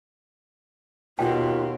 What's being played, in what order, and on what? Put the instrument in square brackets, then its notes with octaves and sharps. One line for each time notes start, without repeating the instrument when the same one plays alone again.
[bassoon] D#2 [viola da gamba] B2 [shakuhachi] F4 [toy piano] G5